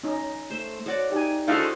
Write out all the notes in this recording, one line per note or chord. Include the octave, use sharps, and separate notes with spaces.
C#4 D#4
A3 C5 E5
A3 F#4 C#5 D5
D#4 G4 G#5
D3 G#3 A3 E4 F#4 C5 F5